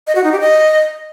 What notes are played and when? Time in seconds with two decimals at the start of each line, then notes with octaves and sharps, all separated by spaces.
0.07 D#5
0.15 F#4
0.24 D#4
0.32 G4
0.40 D#5